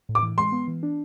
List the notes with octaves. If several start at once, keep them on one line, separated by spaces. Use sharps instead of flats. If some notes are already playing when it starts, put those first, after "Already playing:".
A2
D6
E3
G#3 C6
B3
E3
D4